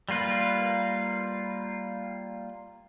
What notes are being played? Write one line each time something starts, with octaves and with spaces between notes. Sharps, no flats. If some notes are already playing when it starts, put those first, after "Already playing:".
G3 A#3 F4 B4